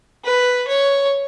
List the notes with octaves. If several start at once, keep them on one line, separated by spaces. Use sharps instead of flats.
B4
C#5